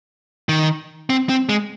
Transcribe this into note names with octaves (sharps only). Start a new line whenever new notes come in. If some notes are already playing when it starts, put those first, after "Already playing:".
D#3
C4
C4
G#3